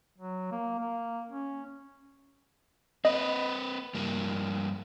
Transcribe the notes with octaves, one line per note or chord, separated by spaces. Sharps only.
F#3
A#3
A#3
C#4
C4 B4 D#5
G2 A#3